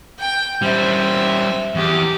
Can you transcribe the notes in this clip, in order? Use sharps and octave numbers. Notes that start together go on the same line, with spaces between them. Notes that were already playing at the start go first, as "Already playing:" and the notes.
G5
G3 C#4 C5 E5
E2 G4